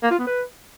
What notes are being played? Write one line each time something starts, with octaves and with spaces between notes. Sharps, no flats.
A#3
F4
B3
B4